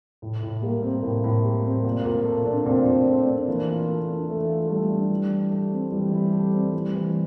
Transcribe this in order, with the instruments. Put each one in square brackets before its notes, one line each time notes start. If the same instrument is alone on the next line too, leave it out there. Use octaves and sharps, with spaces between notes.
[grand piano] A2
A2
[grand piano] G3 [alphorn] A#3
[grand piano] C4
[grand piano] A2 [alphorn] A#3
[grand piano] A2
G3
C4
[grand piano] A#2 [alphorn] A#3
[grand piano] A#2
A3
D4
[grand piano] A#2 [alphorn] C4
[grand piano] A#2
A3
D4
[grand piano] E3 [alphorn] A#3
[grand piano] F4
A3
D4
[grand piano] E3 [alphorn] A3
[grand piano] F4
[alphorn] G3 [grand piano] A3
[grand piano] D4
E3
E4
A3
C4
[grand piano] E3 [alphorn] G3
[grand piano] E4
A3
C4
[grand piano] E3 [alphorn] G3
[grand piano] E3